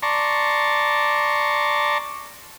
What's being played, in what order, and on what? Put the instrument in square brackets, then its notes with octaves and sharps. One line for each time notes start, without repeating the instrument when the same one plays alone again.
[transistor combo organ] D5 A5 A#5 C6 C#6